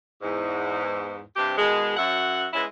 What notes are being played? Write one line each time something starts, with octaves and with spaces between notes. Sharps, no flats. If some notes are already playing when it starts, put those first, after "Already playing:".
E2 G#2
G2 C3 C4 G4
B2 D#3 G#3
F#2 F#3 E5 F#5
G#3 B3 C#4 E4